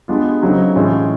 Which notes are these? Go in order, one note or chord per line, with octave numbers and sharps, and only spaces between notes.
G#3 B3 D4 F4
C#3 F#3 A3 C4 D#4
A2 E3 G#3 C#4 F4